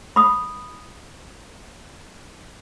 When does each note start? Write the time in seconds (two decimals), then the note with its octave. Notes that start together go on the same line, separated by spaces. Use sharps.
0.16 B5 D#6